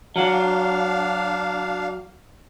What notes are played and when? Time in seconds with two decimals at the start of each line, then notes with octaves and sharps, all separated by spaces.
0.16 F#3 D4 F5